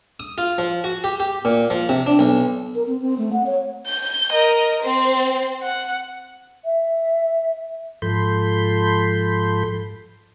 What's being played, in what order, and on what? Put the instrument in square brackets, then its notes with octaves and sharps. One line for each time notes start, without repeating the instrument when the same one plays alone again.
[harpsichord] D#6
F4
F3
F#4
G4
G4
A#2
F3
C3
D4
B1
[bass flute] A#4
C4
C4
A3
F#5
C#5
[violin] G6
A#4 D#5
C4 C5
F#5
[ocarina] E5
[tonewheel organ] G#2 F3 A4 B5 C6 G6